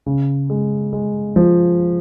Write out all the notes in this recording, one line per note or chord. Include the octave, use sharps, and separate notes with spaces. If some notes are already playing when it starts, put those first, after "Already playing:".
C#3
G#3
G#3
F3